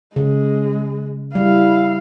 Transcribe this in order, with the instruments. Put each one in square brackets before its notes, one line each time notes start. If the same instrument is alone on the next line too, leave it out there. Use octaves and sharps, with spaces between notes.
[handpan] C#3 [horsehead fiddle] G#3
[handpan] G3 [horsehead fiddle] E4 F5